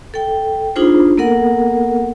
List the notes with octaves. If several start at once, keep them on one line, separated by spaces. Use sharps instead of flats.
A4 G5
D4 D#4 F4 G#4 C5
A#3 B3 A4 A#4 F#5